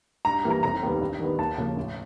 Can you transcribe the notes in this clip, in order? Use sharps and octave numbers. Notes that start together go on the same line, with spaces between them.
G2 A#5
E3 G3 A#3
A#5
F1 A#5
D#2 D#3 G3 B3
G2
D#3 G3 B3
D#2 A5
C#3 F3 A#3
A1